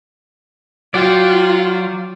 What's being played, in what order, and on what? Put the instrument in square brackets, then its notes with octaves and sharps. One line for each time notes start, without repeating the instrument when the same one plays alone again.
[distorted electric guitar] F#3 [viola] F4 [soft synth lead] F#4 [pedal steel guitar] D5 F#5 G5